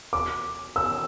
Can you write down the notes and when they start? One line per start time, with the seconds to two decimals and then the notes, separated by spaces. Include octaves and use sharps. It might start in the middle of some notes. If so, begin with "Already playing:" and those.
0.13 D6
0.76 E6